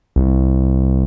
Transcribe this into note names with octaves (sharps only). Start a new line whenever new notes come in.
C2